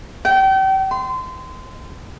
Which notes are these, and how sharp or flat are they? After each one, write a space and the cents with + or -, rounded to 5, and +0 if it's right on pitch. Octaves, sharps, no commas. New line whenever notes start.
G5 -35
C6 -25